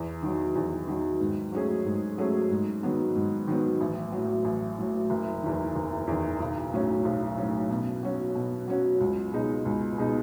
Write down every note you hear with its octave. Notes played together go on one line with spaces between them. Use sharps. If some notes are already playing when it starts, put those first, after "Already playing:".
Already playing: E2
D#3 F#3
E2
D#3 F#3
G#2
F#3 A3 C#4 G#4
G#2
F#3 A3 C#4 G#4
G#2
D#3 F#3 B3
G#2
D#3 F#3 B3
A1
A2 F#3
A1
A2 F#3
F#1
E2 D#3
F#1
E2 D#3
B1
A2 F#3 C#4
B1
A2 F#3 C#4
B2
F#3 C#4 F#4
B2
F#3 C#4 F#4
C#2
B2 G#3 D#4
C#2
B2 G#3 D#4